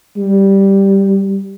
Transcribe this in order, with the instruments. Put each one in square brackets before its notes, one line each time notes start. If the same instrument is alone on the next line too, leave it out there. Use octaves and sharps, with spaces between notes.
[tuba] G3